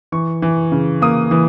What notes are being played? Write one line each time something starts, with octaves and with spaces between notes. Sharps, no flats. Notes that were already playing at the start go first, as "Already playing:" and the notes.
E3 C#6
E3
C#3
A#3 D#6
E3